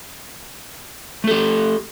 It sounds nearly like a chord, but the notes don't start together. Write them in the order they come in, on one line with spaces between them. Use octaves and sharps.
A3 A4 G4